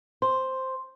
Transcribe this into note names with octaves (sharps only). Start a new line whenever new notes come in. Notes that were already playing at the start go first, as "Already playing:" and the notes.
C5 C6